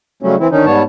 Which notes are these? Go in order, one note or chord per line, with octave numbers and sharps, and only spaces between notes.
C#3 F#3 G3 A3 C#4
E3 C4 E4
D3 D#3 C#4 D#4
G#2 G3 B3 C#5 A5